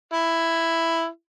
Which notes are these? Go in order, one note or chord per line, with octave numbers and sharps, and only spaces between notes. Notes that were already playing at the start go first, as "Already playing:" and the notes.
E4